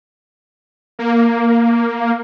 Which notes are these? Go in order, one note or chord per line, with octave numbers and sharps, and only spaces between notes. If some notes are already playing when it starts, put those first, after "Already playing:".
A#3